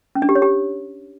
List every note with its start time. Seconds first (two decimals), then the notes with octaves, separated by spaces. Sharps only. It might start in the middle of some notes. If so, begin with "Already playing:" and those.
0.15 C#4
0.22 D4
0.29 G4
0.35 C#5
0.42 G4